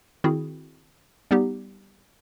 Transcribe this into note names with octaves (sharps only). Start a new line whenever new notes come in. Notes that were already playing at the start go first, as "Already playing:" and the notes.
D#3 C4 E4 F#4 G#4
G3 B3 D#4 G4